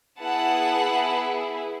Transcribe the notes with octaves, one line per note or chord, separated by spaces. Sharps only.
B3 E4 G#4 F#5 A5